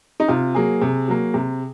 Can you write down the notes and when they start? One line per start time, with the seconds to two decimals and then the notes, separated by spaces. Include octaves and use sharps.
0.20 D#4
0.28 C3 F4
0.54 F#3 A#3 G#4
0.81 C3
1.08 F#3 A#3
1.34 C3